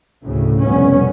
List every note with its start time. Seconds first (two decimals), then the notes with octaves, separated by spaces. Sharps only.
0.22 D2 A2 C#3
0.64 F1 F2 B2 G3 B3 C#4